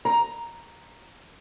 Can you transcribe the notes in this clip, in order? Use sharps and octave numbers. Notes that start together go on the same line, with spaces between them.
A#5